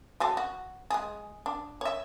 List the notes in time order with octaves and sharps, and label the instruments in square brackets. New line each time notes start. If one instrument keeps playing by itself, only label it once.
[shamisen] F#3 G#3 A4
F#4
G#3 G#4
D4
C#5 E5